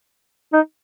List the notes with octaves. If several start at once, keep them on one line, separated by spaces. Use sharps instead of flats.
D#4